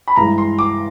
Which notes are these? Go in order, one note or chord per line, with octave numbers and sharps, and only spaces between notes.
B5
G2 E3 G#3 A#5
C6
D6